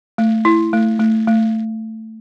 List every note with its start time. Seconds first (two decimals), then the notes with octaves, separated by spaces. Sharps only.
0.18 A3
0.45 E4
0.73 A3
1.00 A3
1.27 A3